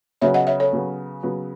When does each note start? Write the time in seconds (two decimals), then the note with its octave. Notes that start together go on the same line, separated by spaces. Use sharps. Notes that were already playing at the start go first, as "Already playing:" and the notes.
0.22 C#3 F#3 B3 F#4 C#5 E5
0.34 D#5 F#5
0.47 C#5 E5
0.60 A4 C#5
0.73 C#3 F#3 B3 F#4
1.23 C#3 F#3 B3 F#4